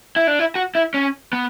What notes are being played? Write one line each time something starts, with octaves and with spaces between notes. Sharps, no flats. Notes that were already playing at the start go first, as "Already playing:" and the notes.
E4
D4
E4
F#4
E4
C#4
B3